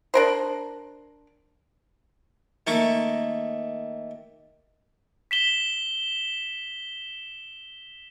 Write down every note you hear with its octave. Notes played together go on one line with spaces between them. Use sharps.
D4 A#4 C5
D#3 A3 A#3 A#4 C#6
B6 E7 G7